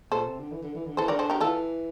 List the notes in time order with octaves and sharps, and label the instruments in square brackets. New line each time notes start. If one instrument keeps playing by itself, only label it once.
[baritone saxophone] A#2 [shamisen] A4 C5
[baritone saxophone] C3
D3
E3
D3
E3
D3
[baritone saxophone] E3 [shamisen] A4 C5
[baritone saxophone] D3 [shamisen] A#4 D5
[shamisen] A4 C5
G4 A#4
[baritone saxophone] E3 [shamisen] F4 A4